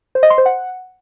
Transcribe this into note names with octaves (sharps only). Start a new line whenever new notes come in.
C5
D#5
C6
C5
F#5